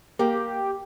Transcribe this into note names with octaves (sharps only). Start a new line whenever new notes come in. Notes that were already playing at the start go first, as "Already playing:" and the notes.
A#3 G4